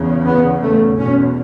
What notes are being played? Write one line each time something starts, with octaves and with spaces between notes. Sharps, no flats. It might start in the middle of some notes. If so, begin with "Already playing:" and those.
Already playing: E2 C#3
B3
A3
E2 B2 C#4